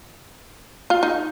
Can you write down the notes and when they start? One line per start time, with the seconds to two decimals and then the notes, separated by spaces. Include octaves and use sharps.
0.90 F4
1.03 D#4